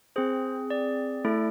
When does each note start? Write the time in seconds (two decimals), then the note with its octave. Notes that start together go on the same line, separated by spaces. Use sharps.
0.16 C4 G#4 C5
0.70 D5
1.25 A3 E4 A4